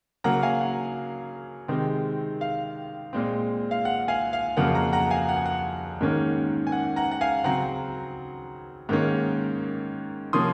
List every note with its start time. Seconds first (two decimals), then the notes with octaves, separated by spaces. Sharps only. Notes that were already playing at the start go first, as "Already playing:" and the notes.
0.24 C#3 F#3 A#3 F#5 A#5
0.42 F5 G#5
0.61 F#5
1.68 C3 D#3 G#3 C4
2.41 F5
3.13 A#2 G#3 C4
3.71 F5
3.85 F#5
4.08 F5 G#5
4.33 F5
4.57 F2 C#3 F#3 A#3 F#5
4.75 F#5 A#5
4.93 F#5 A#5
5.10 F5 G#5
5.29 F#5
5.36 G#5
5.46 F#5
6.01 G#2 D#3 A#3 C#4
6.67 G#5
6.72 F#5
6.96 F#5 A#5
7.11 F#5
7.21 F5 G#5
7.44 C#3 F#3 C4 F#5 A#5
8.89 G#2 D#3 A#3 C#4
10.33 C3 F3 A#3 C#4 C6 D#6